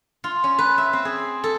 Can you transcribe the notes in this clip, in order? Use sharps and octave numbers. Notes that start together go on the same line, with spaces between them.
F4
C#4
B4
E5
C4
G#4
A4